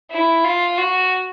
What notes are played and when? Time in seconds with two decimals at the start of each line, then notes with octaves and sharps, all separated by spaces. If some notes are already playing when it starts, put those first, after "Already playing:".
0.11 E4
0.45 F4
0.78 F#4